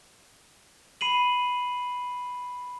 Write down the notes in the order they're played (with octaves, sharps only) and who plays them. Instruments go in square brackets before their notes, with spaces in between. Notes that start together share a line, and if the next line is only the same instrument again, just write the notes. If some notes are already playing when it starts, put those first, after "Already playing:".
[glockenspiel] B5 C7 D#7 F#7